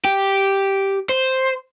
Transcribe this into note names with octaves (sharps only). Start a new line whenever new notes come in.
G4
C5